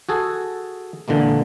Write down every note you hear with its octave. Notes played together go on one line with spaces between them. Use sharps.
F#4 G#4 A4
A#2 D3 E3 G#3 A#3